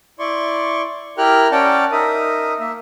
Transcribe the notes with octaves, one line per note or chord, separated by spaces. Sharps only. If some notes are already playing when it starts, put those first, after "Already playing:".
E4 D5 C6 C#6
E4 G4 A#4 G5 F6 F#6
C#4 D5 F#5 G5 A5 A#5
D#4 A#4 E5 D#6
A#3 E5